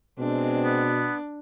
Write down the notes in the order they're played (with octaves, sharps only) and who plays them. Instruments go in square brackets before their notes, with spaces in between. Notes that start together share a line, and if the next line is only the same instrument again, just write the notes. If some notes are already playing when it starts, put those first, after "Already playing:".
[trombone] B2 [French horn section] G#3 C4 [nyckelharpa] D4
[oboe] B3